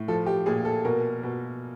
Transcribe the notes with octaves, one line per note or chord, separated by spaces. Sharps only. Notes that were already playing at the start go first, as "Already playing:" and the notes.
Already playing: A2
F3 A4
G4
A#2 G#4
A4
B2 A#4
B2